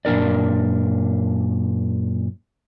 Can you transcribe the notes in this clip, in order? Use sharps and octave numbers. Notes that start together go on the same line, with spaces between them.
F#2 A#2 D4 A#4 D5